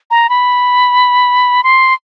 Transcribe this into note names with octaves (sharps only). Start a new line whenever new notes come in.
A#5
B5
C6